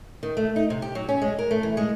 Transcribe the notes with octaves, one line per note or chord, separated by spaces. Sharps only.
D#3
A3
D#4
C3
G4
F#3
C#4
G#3
A#4
A3
E3
G#3